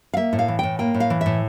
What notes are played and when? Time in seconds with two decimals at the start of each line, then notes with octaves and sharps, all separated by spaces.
0.14 F5
0.17 A#3 E5
0.33 A2
0.39 F5
0.48 E3
0.59 A2 G5
0.79 A#3 G5
0.94 A2
1.00 F5
1.10 E3
1.21 A2 E5